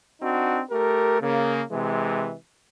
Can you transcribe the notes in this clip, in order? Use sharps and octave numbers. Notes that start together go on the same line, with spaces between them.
C4 D4 D#4 F#4
A3 G4 A#4
C#3 A#3
C3 E3 G#3